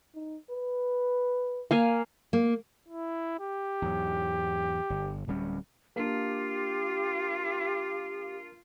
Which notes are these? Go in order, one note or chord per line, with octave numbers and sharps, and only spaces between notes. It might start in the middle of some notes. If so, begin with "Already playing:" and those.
D#4
B4
A#3 F5 G#5
A#3
E4
G4
E2 G#2 F#3
G1
D1 G3 C#4
A#3 D4 F4 G4